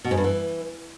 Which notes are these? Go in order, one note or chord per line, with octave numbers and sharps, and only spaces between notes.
B2
G#2
G2
E3